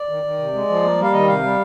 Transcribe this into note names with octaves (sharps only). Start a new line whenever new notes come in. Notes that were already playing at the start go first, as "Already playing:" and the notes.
Already playing: D5
D#3
D#3
C3
G#3
F3
A#3
G3
F5
D#3 D#5
C3 F5
G3